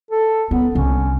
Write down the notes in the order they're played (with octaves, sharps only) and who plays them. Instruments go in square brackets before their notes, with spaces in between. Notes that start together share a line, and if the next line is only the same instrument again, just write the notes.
[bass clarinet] A4
[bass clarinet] B3 [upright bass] C#4
[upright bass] C2 [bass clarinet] C#4